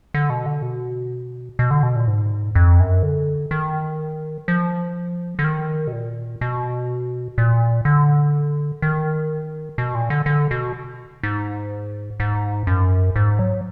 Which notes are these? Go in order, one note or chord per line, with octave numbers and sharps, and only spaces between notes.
D3
B2
D3
B2
B2
D3
B2
A#2
G#2
F2
F#2
D3
D#3
F3
D3
D#3
B2
A#2
B2
A#2
D3
D#3
B2
A#2
D3
D3
B2
G#2
G#2
F#2
G#2
F#3